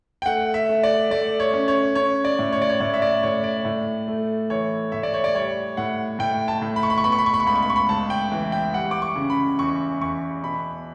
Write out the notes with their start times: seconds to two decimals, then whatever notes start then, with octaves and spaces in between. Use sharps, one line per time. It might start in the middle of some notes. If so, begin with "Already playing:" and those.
0.22 G5
0.26 A3 F#5
0.54 E5
0.69 A3
0.83 D5
1.11 A3 D5
1.40 C#5
1.54 C#4
1.68 C#5
1.95 C#4 C#5
2.25 D5
2.39 A2
2.52 C#5
2.62 D5
2.70 C#5
2.80 A2 C#5
2.94 E5
3.02 D5
3.23 A2 C#5
3.44 D5
3.65 A2
4.08 A3
4.50 E3 C#5
4.92 A2 E5
5.03 D5
5.14 C#5
5.24 D5
5.34 G3 C#5
5.77 A2 F#5
6.19 A2 G5
6.48 A5
6.62 A2
6.76 B5
6.83 C#6
6.90 B5
6.98 C#6
7.04 B3 B5
7.12 C#6
7.18 B5
7.26 C#6
7.34 B5
7.40 C#6
7.47 C#2 B5
7.55 C#6
7.62 B5
7.70 C#6
7.76 B5
7.89 C#2 A5
8.10 G5
8.32 E3
8.52 G5
8.73 G3 F#5
8.91 D6
9.02 C#6
9.16 C#3
9.30 B5
9.59 E2 C#6
10.01 E2 C#6
10.43 B2 B5